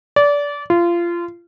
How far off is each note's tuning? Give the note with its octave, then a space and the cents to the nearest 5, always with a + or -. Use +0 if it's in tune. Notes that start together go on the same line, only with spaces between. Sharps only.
D5 -25
F4 -25